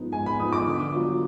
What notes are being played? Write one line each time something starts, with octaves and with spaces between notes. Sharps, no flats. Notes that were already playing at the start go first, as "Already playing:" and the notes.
Already playing: G#2 F3 B3 D#4
G#2 G#5
B5
F3 B3 D#4 D#6
D6
D3
F#3 B3 F4